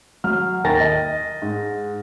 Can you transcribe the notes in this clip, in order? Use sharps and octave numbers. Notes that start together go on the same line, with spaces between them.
F#3 F6
D#2 A#4 G5 A6 A#6
D#5
G#2